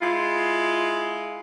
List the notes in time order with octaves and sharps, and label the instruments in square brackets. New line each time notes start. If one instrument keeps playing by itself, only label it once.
[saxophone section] G#3 E4 F4